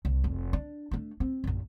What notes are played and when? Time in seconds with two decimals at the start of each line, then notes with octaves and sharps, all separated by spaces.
0.05 C2
0.24 F1
0.53 D4
0.91 A3 D4
1.20 C4
1.44 A#1 F#2